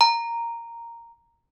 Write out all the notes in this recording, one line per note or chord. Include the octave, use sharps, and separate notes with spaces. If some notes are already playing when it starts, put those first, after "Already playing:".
A#5